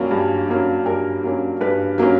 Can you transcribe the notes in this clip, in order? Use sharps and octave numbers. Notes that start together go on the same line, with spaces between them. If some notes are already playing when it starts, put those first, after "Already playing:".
Already playing: G2 F#3 A#3 C#4
G2
F#3 A#3 C#4
G2 A#4
F#3 A#3 C#4
G2 B4
F#3 A#3 C#4